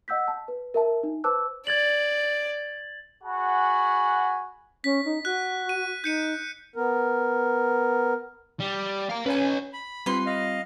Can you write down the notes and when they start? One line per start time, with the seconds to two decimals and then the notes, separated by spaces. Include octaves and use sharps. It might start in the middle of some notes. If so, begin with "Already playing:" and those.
0.08 D#5 F#5 E6 G6 B6
0.28 A5
0.48 B4
0.74 A#4 E5 A5
1.03 D#4
1.24 B4 C5 A5 D6 E6 F#6
1.67 D5 G#6 A6 F#7
3.23 F#4 G#4 F#5 G#5 B5
4.84 C#4 B6
5.05 D#4
5.25 F#4 F#6
5.69 D#7
6.04 D#4 G6 C#7 D#7
6.76 B3 A#4
8.60 G3
9.09 F5 A#5
9.26 C#4 B4 C#5 G#5
9.73 B5
10.06 G3 C4 F4 B4 C6
10.26 D#5 F5